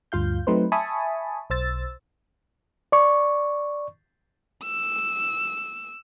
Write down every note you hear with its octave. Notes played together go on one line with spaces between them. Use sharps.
D2 G2 F4 F5 G6
F#3 A3 C4 D#4 B4 C5
E5 G#5 A5 B5 C#6 D#6
B1 C5 E6 A6
D5 C#6
E6